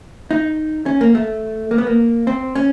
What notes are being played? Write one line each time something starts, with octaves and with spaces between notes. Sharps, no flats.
D#4
C#4
A#3
A3
A#3
B3
A#3
C4
C#4